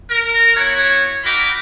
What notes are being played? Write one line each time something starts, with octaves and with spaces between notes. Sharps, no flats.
A#4
B3 E4 F#4 C#5
D#4 F#4 A#4 G5 B5 D6